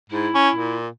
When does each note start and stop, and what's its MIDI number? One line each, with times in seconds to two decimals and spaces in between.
0.10 0.29 44
0.10 0.75 64
0.35 0.50 61
0.55 0.88 46